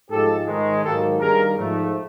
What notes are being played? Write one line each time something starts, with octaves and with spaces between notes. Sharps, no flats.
G#2 F3 G#3 G4 A4
G#2 D#3 G#3
G#2 D#3 F#3 A#3 G4 A4
G2 D#3 G3 A#3 G#4 A#4
G#2 F3 A3